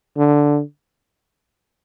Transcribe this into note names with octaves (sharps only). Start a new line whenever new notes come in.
D3